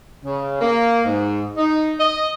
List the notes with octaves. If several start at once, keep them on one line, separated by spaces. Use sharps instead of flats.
C#3
A#3
G#2
D#4
D#5